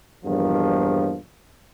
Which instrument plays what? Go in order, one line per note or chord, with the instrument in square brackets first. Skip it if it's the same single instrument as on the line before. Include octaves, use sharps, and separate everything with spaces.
[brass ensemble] A#1 E2 G2 D#3 F3